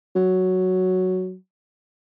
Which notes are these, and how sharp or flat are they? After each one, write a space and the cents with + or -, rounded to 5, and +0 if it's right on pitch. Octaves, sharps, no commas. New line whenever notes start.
F#3 +0